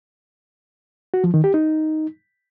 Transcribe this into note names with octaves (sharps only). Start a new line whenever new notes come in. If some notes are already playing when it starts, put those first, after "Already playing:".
F#4
F3
D#3
G4
D#4